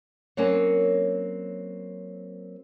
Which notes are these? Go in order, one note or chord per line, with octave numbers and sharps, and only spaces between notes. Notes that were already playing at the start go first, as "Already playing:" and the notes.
F#3 A#3 C4 C#4 A#4 C#5